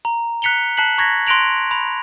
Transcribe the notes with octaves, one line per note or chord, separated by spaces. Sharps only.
A#5
F#6 B6 C#7 F7 G7
A5 F#6 B6 C7 F#7
A#5 C#6 G#6 A#6 B6
C6 F#6 A#6 D7 F7 F#7
B5 F7